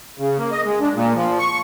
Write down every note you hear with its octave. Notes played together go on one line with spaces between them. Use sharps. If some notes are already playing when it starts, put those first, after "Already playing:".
C#3
A#3
D#5
G#3
D4
A#2
F3
C#6